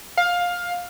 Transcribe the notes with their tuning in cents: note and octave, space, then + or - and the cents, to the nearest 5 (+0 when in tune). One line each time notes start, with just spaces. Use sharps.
F5 +15